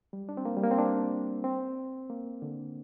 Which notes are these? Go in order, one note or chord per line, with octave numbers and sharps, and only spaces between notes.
G3
D4
C4
A#3
G3
A#3
C4
D4
C4
A#3
D3